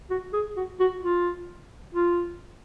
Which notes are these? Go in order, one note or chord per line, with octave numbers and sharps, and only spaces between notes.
F#4
G#4
F#4
F#4
F4
F4